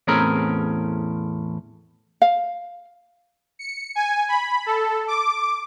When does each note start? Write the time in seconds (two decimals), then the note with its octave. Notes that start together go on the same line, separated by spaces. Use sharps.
0.08 E2 A2 C4 C#4 G#4 A#4
2.22 F5
3.59 C#7
3.95 G#5
4.29 B5
4.66 A4
5.08 D6